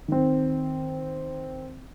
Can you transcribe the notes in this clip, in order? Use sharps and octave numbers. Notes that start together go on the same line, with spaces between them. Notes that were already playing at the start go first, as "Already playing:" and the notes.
D#3 C4